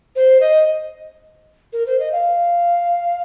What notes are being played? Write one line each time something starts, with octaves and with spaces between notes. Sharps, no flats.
C5
D#5
A#4
C5
D#5
F5